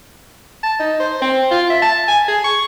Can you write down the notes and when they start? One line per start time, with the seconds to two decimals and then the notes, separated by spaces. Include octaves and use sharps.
0.63 A5
0.79 D#4
1.00 C5
1.22 C4
1.51 F4
1.70 E5
1.82 A5
2.08 G#5
2.28 G#4
2.44 C#6